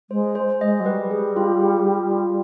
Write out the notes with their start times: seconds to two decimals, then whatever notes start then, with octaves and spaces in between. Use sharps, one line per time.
0.10 G#3 C5
0.35 C5
0.61 G#3 D#5
0.80 F#3
0.86 G3 B4
1.11 G#4
1.37 F4
1.61 G#4
1.87 F4
2.11 F4